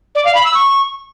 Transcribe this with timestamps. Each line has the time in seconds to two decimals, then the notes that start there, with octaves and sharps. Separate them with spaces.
0.15 D5
0.25 F5
0.35 B5
0.45 E6
0.54 C#6